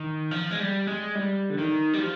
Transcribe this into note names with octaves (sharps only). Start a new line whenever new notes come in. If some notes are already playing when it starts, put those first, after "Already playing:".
Already playing: D#3
F3
G#3
G3
G#3
G3
D3
D#3
G3
F3